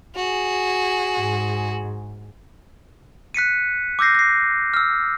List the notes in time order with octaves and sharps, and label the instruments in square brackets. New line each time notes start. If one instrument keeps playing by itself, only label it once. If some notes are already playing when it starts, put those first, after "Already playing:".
[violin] F#4 G#4
[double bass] G#2
[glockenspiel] F#6 B6 C#7 D#7
D6 E6 G6 A#6 C7
A#6 C7
E6 F6